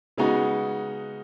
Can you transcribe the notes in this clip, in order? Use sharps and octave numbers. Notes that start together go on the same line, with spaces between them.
C#3 G#3 B3 D#4 F#4